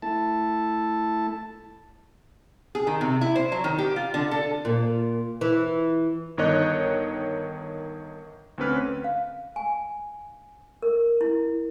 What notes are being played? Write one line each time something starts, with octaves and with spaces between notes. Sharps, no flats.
A3 E4 A5
G#4
D#3
C3
E4
C5
F#3
D#3
G4
F4
D3
A4
A#2
E3
G1 D#3 C#5 D#5 F#6
D2 C4 C#4 B4 F6
F5
G#5
A#4
E4